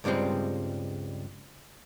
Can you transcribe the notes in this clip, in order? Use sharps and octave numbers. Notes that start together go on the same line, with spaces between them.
C#2 G2 G3 G#3 C4